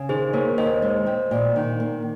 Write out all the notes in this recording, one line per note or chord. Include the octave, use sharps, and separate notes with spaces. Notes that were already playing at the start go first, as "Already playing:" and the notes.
Already playing: C#3
D#3 G#4 C5
A#3 A#4 C#5
D#2 C5 D#5
G#3
C4
A#2
D#3
A#3